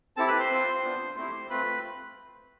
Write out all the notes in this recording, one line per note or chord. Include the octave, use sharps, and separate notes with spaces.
C4 E4 G4 A4 A5
B4 B5
C5 C6
C4 F4
B3 D4 F4
A3 C4 E4 G4 C5 C6
A3 C4 F4 B4 B5